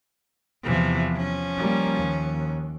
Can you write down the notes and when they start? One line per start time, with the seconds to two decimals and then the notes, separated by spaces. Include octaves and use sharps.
0.64 E2 C3 E3 F3
1.16 F3 C#4
1.57 G3 A#3
1.97 D#2